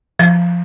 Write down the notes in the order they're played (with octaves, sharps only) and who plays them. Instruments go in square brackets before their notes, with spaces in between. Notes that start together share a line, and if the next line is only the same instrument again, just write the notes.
[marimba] F3